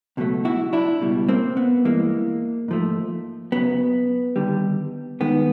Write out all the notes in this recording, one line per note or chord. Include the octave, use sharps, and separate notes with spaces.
C#2 B2 F#3 A3
E4 F#4
D4 E4
C#2 B2 G3
A#3 C4
B3
G2 E3 G#3 A#3
G#2 F3 A3
F#2 C#3 F#3 B3
D#2 D3 G3
G2 D#3 G#3 B3